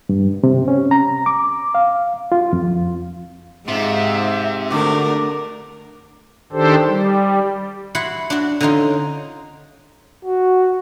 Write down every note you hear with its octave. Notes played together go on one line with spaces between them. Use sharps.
G2
C3
C#4
A#5
D6
F5
F4
F2
G#2 C3 F4 E5
D3 A3 D4 F#4 A#4 D6
D#3 D4 G4 A4 C5
G3
E4 F#4 F#5 C6
D4 F#4
D3 C#4 D#4 F4
F#4